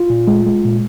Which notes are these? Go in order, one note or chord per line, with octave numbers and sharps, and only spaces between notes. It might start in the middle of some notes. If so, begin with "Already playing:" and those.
Already playing: F4
A#2
G#3
G#3
A#2